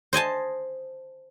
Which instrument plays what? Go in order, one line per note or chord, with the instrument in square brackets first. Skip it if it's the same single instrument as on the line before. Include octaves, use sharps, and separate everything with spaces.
[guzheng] C5 D#5 G#5 A5